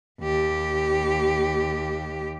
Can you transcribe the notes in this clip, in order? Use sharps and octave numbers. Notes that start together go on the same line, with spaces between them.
D#2 G4